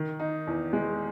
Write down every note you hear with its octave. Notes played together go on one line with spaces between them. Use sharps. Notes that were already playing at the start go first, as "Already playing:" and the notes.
Already playing: D#3
D#4
E2
G#3